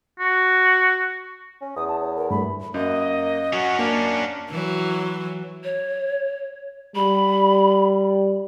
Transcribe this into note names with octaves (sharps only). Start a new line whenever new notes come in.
F#4
C#4
E2 D#6
A5
C#5
A#4
G2 A3 B5
F#2 A#3 D#5
F#3 C#4 F#4
A#3 D4
E3 F#3
C#5
G3 B5